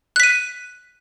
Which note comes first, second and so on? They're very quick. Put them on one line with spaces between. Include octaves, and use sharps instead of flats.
F#6 B6 D#7